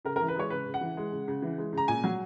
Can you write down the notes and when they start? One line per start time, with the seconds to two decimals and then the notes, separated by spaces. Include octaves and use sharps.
0.05 C#3 A#4
0.16 E3 A#4
0.28 B4
0.36 G#3 C#5
0.50 C#3 B4
0.66 C#3
0.74 F#5
0.81 E3
0.97 G#3
1.12 C#3
1.28 C#3
1.42 E3
1.58 G#3
1.73 C#3 A#5
1.88 A#2 G#5
2.04 F#3